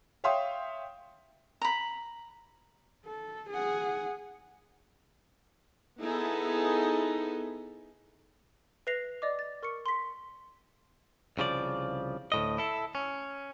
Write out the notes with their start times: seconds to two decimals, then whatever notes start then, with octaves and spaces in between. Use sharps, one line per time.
0.24 C#5 E5 F5 G5 C6 D#6
1.61 A#5 B5
3.06 A4
3.50 G#4 F#5
6.01 B3 D#4 E4 G#4 A4
8.87 B4 E5 A#6 C7 F7
9.22 D5 D#5 D6
9.39 A6
9.63 A#4 C#6 D6 C#7
9.86 C6 B6
11.38 C2 C#3 F3 D5
12.32 D2 A2 D#5
12.58 E4 A4
12.95 C#4